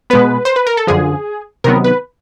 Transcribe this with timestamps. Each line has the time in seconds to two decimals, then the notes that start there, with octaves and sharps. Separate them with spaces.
0.10 B2 G#3 B3 B4
0.45 C5
0.56 B4
0.67 A#4
0.77 A4
0.87 F#2 D3 F3 G#4
1.64 C3 D#3 F#3 B3 A#4
1.84 B4